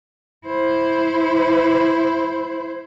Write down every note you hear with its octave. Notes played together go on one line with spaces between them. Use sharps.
E4 C5